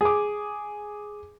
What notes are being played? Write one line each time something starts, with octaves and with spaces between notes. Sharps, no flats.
G#4 D6